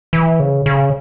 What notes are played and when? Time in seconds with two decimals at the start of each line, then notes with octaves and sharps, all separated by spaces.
0.13 E3
0.40 C#3
0.66 C#3